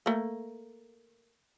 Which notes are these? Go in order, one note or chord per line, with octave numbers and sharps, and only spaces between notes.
A3 A#3